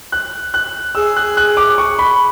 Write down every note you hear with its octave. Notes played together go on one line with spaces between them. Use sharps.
F#6
F#6
G#4 E6
F#6
F#6
D6
C#6
B5